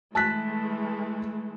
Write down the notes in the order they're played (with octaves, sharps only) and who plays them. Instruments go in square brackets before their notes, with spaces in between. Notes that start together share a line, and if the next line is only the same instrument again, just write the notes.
[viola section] E3 G#3 A3 [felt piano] A5 F#6 B6